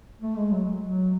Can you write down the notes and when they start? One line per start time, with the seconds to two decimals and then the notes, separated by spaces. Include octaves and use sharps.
0.21 A3
0.36 G#3
0.52 F#3
0.82 F#3